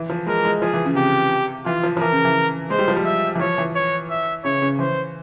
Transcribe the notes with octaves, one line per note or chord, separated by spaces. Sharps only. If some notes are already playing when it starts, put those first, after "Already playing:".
Already playing: E3
F3
G#3 A#4
G#3
F3 G#4
E3
C#3
C3 G4
E3 F4
F3
F3
E3 A#4
C#3
E3
G#3 C5
G3
F3
G3
E5
E3
F3 C#5
E3
C#5
E5
C#3 C#5
C#3
E3 C5